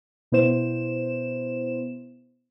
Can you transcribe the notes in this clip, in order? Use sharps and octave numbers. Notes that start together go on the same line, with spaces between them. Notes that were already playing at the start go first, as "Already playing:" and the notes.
B2 B3 E4 C5 E7